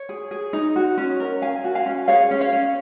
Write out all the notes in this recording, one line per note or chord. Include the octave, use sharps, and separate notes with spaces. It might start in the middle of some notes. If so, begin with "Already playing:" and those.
Already playing: C#5
G#4
G#4
D#4
F#4
C#4
A#4
C#4 F5 G#5
F#4
F5 G#5
C#4
G#4 C#5 F5
C#4
C#5 F5
C#4